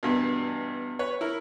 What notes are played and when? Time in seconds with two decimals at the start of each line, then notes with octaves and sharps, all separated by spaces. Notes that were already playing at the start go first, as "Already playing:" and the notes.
0.03 E2 G2 B2
0.99 B4 C#5
1.21 E4 A#4